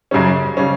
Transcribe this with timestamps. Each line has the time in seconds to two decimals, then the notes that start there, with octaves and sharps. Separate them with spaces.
0.11 F#2 C#3 G3 C#4
0.57 C#3 G3 C#4